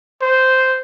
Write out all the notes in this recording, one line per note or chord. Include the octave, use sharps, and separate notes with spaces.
C5